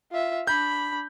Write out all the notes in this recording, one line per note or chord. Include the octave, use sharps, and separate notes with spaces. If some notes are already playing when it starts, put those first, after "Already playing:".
F4 E5
D4 B5 G6